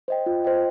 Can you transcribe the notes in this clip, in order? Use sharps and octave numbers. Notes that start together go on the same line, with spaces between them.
C5 D#5 G5
F4
C5 D#5 G5